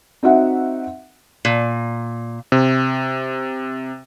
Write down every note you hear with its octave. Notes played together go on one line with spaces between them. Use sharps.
C4 D#4 F#4 E5 F#5
A#2
C3